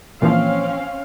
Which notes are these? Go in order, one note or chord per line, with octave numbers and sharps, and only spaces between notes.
A#2 E3 F3 C4 C#4 F5